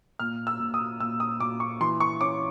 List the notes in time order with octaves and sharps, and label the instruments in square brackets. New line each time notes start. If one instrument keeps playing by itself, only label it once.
[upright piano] A#2 F6
E6
A#2
D#6
A#2 E6
D#6
A#2 D6
C#6
E3 C6
C#6
C#4 D6